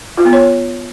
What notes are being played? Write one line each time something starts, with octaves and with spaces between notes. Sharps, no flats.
F4
B3
C#5